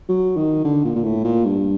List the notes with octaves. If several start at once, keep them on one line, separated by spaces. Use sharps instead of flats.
F#3
D#3
D3
A#2
A#2
A2
A#2
G2